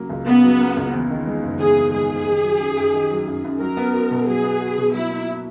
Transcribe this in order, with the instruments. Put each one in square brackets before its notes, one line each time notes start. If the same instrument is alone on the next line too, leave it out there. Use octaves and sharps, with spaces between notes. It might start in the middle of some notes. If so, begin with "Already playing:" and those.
Already playing: [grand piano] C#3 F#3 A#3
C#2
[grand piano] C#3 [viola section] B3
[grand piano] F#3
A#3
C#2
E2
D#3
G#3
F#1
[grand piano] E2 [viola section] G#4
[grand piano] D#3
[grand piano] G#3 [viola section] G#4
[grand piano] F#1
D#3
F#3
F#2
F#2
D#3
F#3
F#2
F#2
[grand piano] F#3 [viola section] A#4
[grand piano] B3
F#4
B2
[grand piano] F#3 [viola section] G#4
[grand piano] B3
F#4
B2
[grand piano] F#3 [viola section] E4
[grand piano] A#3
E4